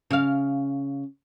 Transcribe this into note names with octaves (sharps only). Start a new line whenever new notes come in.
C#3 F5